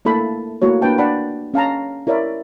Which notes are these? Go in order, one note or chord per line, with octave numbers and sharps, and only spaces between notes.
A3 A#3 E4 A4 B5
A3 A#3 E4 F#4 C#5
A#3 D4 B4 G5 A5
D4 D5 F#5 A5 B5
C#4 F5 A5 A#5
E4 A#4 C#5 D5 E5